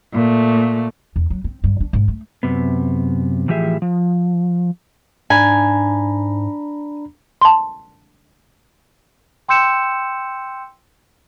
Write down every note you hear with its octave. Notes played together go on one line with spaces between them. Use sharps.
A#2 A3
E2
F#3
C4
G2
D4
G#2
A3
F#2 C3 B3
A2 E3 F3 G4 G#4 E5
F3
G#2 D4 G#5 A#5 B5
A5 C6
G5 C6 E6 G6 C#7 E7